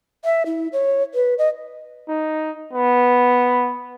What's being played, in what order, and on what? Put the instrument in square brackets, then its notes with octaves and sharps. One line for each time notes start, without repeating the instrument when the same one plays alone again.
[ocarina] E5
E4
C#5
B4
D#5
[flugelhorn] D#4
B3